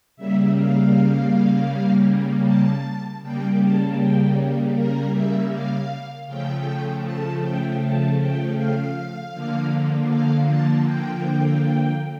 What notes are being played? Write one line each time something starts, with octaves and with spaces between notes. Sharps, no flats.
C#3 G3 A#3 E5
F5
A5
C#3 G3 A#3 G5
A5
G5
A#4
E5
F5
C#3 F3 A3 G5
A5
G5
A5
G5
F5
D3 F3 A#3
F5
A5
G5